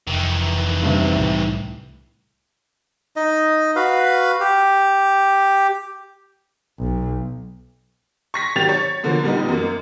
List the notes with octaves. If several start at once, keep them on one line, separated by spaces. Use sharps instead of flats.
F1 D#3 E3
G2 C3
C2 A2
D#4 D#5
F#4 B4 F5
G4
B1
C#6 A#6 B6
G#1 D#3 F#3 G4 A6 F7
C#5
B2 D3 F3 A#3
A#2 G3 B3 D#4
F#2 A#3